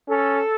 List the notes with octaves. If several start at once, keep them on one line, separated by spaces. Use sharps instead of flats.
C#4 A4